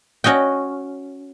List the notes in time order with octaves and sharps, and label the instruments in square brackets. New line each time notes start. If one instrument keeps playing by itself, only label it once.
[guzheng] C#4 F#4 D#5 G5